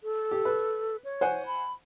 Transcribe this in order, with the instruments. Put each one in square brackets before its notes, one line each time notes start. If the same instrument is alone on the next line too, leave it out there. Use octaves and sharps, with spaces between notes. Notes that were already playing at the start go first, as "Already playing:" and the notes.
[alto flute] A4
[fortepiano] G4
B4
[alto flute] C#5
[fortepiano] C5 F#5 G#5
[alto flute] B5